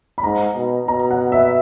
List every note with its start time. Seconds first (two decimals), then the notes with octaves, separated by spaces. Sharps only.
0.18 B5
0.23 G#2 A#5
0.55 B2
0.88 B2 A#5
1.11 F#5
1.32 E5